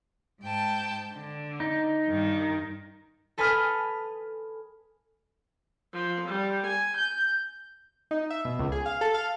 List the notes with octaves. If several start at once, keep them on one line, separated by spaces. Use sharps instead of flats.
G#2 G5 A5
D3
D#4
G2 D#3
A4 B4 G#5 B5 D#6 F6
F3
G3
G#5
G6
D#4
E5
B2
C#2
G#4
F5
A4
F5